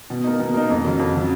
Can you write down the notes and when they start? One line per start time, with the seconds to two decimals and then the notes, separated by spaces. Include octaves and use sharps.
0.10 B2
0.24 A#3 D#4
0.40 B2
0.54 A#3 D#4
0.70 F2
0.85 C#3 F#3
1.00 F2
1.15 C#3 F#3